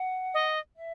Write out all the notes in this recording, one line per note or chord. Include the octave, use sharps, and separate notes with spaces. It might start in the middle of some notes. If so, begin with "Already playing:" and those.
Already playing: F#5
D#5
E5